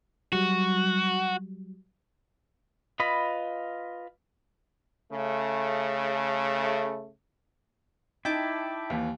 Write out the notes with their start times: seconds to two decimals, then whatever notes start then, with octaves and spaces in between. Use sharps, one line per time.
0.33 F#3 G3 F#4
3.00 F4 B4 D#5 B5
5.12 C#3 A3
8.25 D#4 E4 G5 A5 D6
8.90 D#2 E3